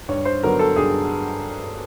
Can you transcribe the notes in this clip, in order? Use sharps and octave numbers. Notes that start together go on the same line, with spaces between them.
G2 C#5
C5
D3 F#3 B3 A#4
A4
G2 G#4